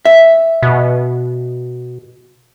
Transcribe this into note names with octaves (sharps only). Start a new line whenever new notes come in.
E5
B2